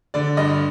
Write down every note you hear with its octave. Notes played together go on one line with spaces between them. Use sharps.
D3 D5
G2 D#5